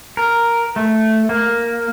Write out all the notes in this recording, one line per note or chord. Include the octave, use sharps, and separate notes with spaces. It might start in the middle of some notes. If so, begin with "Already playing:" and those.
A#4
A3
A#3